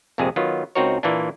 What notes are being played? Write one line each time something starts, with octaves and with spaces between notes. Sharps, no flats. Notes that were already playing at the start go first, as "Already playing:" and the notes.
A#1 F2 C3 G#3 G#4
D#3 F#3 B3 F4
C#2 C4 D#4 F#4 A#4 C#5
A#2 E3 A#3 D4